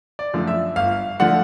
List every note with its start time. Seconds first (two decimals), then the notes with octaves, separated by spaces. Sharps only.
0.19 D5
0.33 F#2 D3 F3 A3
0.47 E5
0.76 G1 F5
1.20 D3 F3 A3 F#5